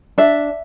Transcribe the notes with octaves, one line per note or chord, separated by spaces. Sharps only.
D4 E5